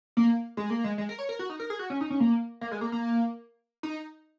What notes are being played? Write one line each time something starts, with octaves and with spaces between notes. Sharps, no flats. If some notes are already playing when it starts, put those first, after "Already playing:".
A#3
G#3
A#3
G#3
G#3
A#4
C#5
A#4
F#4
D#4
A#4
G#4
F#4
C#4
D#4
C#4
A#3
A#3
G#3
A#3
A#3
D#4